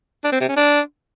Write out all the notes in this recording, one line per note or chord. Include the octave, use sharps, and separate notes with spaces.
D4
C4
C3
C#4
D4